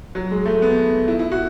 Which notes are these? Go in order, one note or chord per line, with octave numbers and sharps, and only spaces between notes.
F#3
G#3
A3
B3
E4
E4
F#4